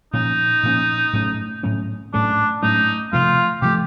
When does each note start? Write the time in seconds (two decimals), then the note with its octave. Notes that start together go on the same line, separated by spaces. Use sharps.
0.13 A#2 F3 A#3 C#4 D#4
0.63 A#2 F3 A#3 C#4
1.13 A2 F#3 A3 C#4
1.63 A2 F#3 A3 C#4
2.13 A2 F#3 A3 C#4 D4
2.63 A2 F#3 A3 C#4 D#4
3.13 C3 F3 A3 F4
3.62 C3 F3 A3 G4